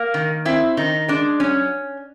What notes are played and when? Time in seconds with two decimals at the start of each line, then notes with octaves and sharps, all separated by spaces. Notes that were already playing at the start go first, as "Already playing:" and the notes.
Already playing: A#3
0.14 D#3
0.45 C4 E4
0.77 D#3 D#4
1.08 G#3 D4
1.40 F#3 C#4